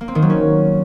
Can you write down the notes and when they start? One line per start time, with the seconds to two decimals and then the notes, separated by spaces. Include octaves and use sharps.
0.01 A#3
0.08 C4
0.15 D#3
0.22 F#3
0.30 C#4